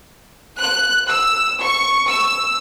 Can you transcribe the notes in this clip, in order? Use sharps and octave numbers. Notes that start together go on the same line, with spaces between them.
F#6
E6
C#6
E6